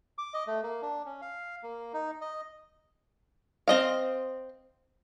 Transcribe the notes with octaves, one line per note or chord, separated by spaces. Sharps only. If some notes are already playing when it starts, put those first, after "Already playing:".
D6
D#5
A3
A#3
D4
C#4
F5
A#3
D#4
D#5
C4 D#5 F5